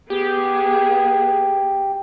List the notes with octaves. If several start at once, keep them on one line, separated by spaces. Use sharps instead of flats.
B3 G4 G#4